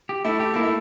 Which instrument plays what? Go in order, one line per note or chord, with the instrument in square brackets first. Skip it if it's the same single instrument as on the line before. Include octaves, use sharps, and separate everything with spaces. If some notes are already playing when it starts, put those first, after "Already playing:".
[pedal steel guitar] G4
[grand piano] A3 [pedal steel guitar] E4
[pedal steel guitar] G4
[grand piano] A#3 [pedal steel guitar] E4
[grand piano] A3